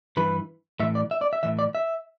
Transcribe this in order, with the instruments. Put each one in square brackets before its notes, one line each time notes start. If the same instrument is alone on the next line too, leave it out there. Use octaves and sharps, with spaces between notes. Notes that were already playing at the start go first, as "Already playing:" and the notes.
[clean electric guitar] G2 E3 B4
A2 E3 E5
D5
E5
D5
E5
A2 E3 E5
D5
E5